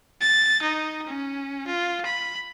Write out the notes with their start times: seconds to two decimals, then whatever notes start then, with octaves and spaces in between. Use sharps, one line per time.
0.21 A6
0.62 D#4
1.07 C#4
1.67 F4
2.06 B5